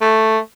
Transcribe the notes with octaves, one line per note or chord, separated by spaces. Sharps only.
A3